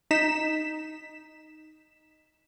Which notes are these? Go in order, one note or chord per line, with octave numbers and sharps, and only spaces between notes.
D#4 B6 E7